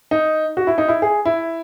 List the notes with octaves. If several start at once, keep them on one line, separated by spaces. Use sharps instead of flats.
D#4
F#4
E4
D#4
E4
G#4
E4